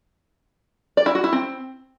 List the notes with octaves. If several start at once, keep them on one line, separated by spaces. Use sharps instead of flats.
D5
E4
F#4
E4
C4